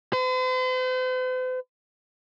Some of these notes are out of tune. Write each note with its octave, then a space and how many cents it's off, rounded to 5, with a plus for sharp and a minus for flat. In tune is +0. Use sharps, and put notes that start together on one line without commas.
C5 -45